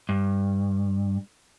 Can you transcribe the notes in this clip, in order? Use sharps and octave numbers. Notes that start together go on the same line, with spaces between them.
G2